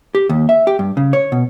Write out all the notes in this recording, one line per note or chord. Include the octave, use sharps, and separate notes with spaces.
G4
D#2
E5
G4
G2
C#3
C#5
B2